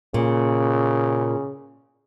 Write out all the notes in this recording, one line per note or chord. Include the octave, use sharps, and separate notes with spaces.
A#2 C#3